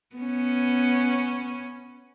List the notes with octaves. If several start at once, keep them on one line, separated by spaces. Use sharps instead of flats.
B3 C#4